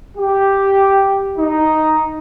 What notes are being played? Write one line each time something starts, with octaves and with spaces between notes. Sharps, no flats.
G4
D#4